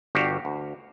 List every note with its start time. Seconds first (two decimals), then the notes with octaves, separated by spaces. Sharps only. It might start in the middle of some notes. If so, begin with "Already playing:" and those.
0.15 G1 G2 F#4 G4 F5
0.45 D2